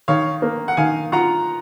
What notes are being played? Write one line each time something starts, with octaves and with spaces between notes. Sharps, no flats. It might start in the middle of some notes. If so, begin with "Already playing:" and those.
D#3 C#5 F5
A#3
F#5
D#3 F5 G#5
F4 F#5 A#5